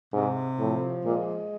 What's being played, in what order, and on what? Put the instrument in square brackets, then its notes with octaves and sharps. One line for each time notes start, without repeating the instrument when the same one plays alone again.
[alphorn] G#2 [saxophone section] C3
[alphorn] A2 [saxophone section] F3
[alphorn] A#2 [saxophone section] G#3